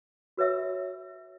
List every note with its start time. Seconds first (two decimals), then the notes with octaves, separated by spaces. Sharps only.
0.37 F#4 B4 C#5 E5 E6